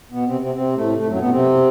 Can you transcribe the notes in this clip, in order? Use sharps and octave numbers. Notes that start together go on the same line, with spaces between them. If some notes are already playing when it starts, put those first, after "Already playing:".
B2 B3
C3 C4
C3 C4
C3 C4
A2 A3
A2 A3
F#2 F#3
B2 B3
C3 C4